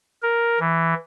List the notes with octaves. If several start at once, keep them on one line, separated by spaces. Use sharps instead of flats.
A#4
E3